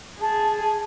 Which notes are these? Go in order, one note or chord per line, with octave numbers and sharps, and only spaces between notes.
G#4 A5